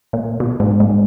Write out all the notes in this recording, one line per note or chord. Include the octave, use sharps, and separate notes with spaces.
A#2
B2
G#2
G#2